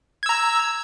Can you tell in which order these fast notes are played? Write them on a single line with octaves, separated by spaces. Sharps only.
G#6 E6 A#5